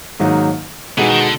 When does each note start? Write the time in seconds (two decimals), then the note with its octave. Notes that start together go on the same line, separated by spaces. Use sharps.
0.19 G#2 D#3 F#3 A#3 D#4
0.97 B2 E3 G#3 B3 D#4 F#4
1.09 D#3
1.21 D3